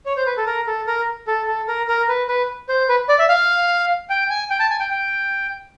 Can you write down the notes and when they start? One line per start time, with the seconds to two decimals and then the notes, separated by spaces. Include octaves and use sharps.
0.06 C#5
0.17 C5
0.27 B4
0.37 A4
0.47 A#4
0.67 A4
0.87 A#4
1.27 A4
1.47 A4
1.68 A#4
1.88 A#4
2.08 B4
2.28 B4
2.69 C5
2.89 B4
3.09 D5
3.19 E5
3.29 F5
4.10 G5
4.30 G#5
4.50 G5
4.60 A5
4.70 G#5
4.80 G5
4.91 G5